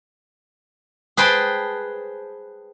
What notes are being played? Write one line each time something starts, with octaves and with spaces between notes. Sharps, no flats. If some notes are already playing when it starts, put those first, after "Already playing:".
G#4 B4 C5 G5 A5